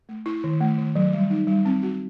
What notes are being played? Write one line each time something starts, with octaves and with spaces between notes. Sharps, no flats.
A3
E4
D#3
A3
D#3
F#3
G3
D#4
G3
C4
F#4